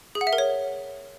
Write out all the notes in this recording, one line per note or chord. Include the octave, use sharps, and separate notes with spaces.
G#4
F#5
E5
A#4
C#5